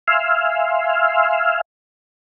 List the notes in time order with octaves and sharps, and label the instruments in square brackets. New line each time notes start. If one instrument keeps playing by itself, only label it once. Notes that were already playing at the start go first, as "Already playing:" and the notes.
[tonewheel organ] E5 F5 G#5 C6 E6 F6